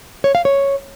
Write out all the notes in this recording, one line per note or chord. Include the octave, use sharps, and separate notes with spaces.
C#5
F5
C#5